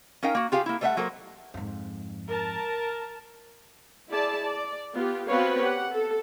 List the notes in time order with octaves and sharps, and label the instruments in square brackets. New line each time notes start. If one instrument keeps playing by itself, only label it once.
[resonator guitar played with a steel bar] C#4 D#4 A#4 F5 G5
A#3 F#4
F4 G4 G#4 F5
A#3 E4
G3 A3 C5 D#5 E5 F#5
F#3 A#3 A4 A#4 C5
[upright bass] F2 G#2
[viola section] A#4 A5
E4 G#4 D5 A5
D5
B3 F4 G4
B3 C4 F#4 B4 C#5 F5
G4 F#5
A4